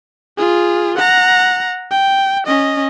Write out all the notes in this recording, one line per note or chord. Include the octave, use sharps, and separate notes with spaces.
F4 G#4
F#5 A#5
G5
C#4 D#5